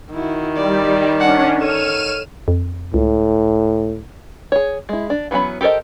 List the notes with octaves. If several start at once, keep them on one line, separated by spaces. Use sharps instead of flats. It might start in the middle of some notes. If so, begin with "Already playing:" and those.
D#3 E4 F#4
G3 D5
C#4 D4 D5 F#5
A4 C#5 F6 D#7 E7
F2
C#2 A2
G#4 C#5
G#3 E4
D4
E3 F#3 B3 C#4 B5
G4 A4 A#4 C5 D#5